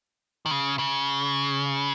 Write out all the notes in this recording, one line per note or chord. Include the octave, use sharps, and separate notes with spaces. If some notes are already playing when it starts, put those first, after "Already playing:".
D#3
C#3
C#3